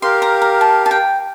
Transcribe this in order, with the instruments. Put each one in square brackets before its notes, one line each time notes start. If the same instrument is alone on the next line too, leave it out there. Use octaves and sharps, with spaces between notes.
[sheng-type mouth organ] G4 A#4 F5 [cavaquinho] C6
[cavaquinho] A#5
A#5
A5
A5
G5